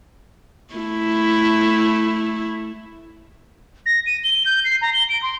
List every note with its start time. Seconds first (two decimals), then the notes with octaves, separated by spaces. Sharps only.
0.74 A3 E4
3.86 A#6
4.06 D#7
4.24 G7
4.46 G6
4.65 C7
4.82 A#5
4.93 G7
5.09 D7
5.23 C6